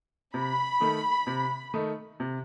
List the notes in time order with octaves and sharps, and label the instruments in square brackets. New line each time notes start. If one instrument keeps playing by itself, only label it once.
[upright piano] C3 [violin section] B5
[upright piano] D#3 A3 D#4
C3
D#3 A3 D#4
C3